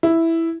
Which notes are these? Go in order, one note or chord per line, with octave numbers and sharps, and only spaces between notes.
E4